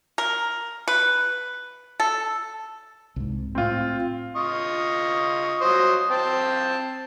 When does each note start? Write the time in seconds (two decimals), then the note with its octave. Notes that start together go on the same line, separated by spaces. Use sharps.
0.18 A#4
0.88 B4
2.00 A4
3.16 C2 G#2
3.55 A2 C4 F4
4.36 F4 D#5 C#6
5.61 F#3 C5 D#5
6.10 C4 G5 A5